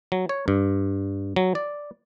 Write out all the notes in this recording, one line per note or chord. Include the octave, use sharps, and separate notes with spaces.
F#3
C#5
G2
F#3
D5